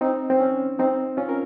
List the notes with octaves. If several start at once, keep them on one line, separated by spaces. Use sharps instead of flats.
C4 D#4
C4
C#4
C4 D#4
C#4 F4
A#4